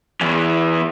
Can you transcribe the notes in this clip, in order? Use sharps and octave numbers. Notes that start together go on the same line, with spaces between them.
E2 E3